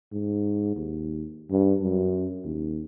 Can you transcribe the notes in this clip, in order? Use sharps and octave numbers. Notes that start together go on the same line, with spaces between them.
G#2
D#2
G2
F#2
D#2